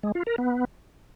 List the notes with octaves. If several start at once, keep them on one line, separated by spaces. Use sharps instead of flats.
G#3
F4
A#4
B3